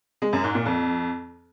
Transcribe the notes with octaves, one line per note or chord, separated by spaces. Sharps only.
G#3
F#2
G#2
A#2
F2